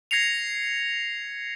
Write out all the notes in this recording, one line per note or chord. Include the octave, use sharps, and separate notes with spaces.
G#6 A#6 C7 C#7 F7